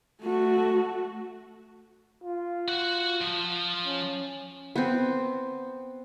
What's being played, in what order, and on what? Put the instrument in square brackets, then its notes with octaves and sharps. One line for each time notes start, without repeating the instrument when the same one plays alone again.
[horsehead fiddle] A3 F#4
[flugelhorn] F4
[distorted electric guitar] F#4 F#5
F3
[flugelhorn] C#4
[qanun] B3 C4